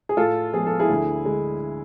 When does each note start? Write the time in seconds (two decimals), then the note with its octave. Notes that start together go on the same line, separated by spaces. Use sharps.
0.09 G#4
0.17 A2 F4 A4
0.53 F3 G#3 B3 G#4
0.67 A4
0.80 E4 G#4
0.89 D2
1.25 D3 G#3